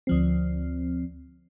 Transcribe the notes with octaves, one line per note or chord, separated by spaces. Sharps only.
D2 F3 C4